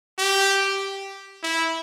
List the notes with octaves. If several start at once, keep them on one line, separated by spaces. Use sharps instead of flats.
G4
E4